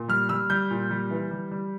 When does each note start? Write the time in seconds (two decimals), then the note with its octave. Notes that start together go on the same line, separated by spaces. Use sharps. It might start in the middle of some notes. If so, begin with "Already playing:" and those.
Already playing: A#2
0.08 G3 F6
0.29 G3 E6
0.50 G3 G6
0.70 A#2
0.91 G3
1.11 E3
1.31 G3
1.51 G3